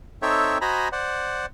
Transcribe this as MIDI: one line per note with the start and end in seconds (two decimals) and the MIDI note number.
0.22 0.58 60
0.22 0.58 63
0.22 0.58 69
0.22 0.58 73
0.22 0.58 76
0.22 0.58 79
0.61 0.89 66
0.61 0.89 72
0.61 0.89 75
0.61 0.89 80
0.61 0.89 82
0.61 0.89 83
0.92 1.46 72
0.92 1.46 74
0.92 1.46 78